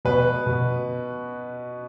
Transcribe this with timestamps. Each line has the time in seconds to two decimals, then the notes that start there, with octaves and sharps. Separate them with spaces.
0.05 B2 B4
0.47 B2